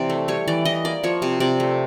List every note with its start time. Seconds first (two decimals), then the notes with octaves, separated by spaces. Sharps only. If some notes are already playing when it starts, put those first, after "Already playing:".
Already playing: C3 E3 D5
0.10 A3
0.28 G3 C#5
0.48 E3 D5
0.65 E3 D#5
0.85 A#3 D5
1.03 F3 C#5
1.22 C3
1.40 C3 D5
1.60 A3